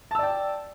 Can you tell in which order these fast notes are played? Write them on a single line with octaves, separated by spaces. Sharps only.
A5 E6 D5 G5